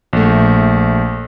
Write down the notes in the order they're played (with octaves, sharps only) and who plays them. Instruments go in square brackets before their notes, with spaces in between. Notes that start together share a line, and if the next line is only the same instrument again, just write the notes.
[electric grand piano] A#1 A3